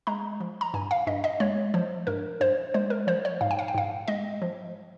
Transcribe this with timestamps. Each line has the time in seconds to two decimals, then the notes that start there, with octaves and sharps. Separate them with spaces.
0.07 G#3 A#5
0.40 F3
0.61 A#5
0.74 G2 G#5
0.91 F5
1.07 G2 D#5
1.24 D#5
1.40 G#3 C#5
1.74 F3 C5
2.07 G2 A#4
2.41 G2 C5
2.74 G#3 C5
2.90 A#4
3.07 F3 C5
3.25 C#5
3.41 G#2 F5
3.51 G5
3.59 F5
3.68 G5
3.74 G#2 F5
4.08 G#3 D#5
4.42 F3